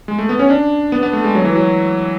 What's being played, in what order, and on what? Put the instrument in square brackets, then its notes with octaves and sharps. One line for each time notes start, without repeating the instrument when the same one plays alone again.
[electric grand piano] G#3
A3
B3
C#4
D4
B3
B3
A3
G#3
F#3
E3
F#3